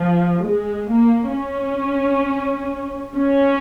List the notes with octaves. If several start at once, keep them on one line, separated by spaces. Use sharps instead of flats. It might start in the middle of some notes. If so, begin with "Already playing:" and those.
Already playing: F3
G#3
A#3
C#4
C#4